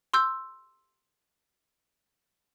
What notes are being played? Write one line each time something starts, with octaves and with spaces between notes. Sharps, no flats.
C6 E6 G6